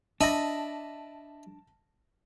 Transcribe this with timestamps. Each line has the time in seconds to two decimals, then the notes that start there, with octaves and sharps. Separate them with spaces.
0.21 D4 D#5 E5 A5 B5 A#6